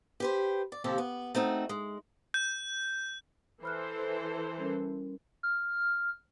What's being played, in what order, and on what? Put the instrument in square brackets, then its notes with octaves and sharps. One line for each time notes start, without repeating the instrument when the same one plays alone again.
[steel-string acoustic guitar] G4 B4 C5
D5
D#2 C3 F3 G4 A4
B3
A3 C4 D#4 F#4
G#3
[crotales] G6
[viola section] E3 A4 C5 [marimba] B5 F6 F#6
[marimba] G3 C#4 A#4
[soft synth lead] F6